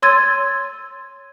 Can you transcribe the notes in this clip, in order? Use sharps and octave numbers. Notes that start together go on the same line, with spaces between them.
C#5 C6 E6 G#6 A6 D#7